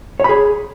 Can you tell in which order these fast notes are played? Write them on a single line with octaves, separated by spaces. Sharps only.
C#5 B5 G#4